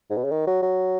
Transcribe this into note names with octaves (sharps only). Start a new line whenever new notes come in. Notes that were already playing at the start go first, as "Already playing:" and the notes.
G#2
B2
C#3
D#3
F#3
F#3